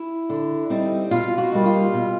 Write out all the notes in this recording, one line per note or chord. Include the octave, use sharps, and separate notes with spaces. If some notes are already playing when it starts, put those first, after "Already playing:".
Already playing: E4
D3
G3 C4 D#4
B2 F4
F#4
G3 A#3 D#4
F4
B2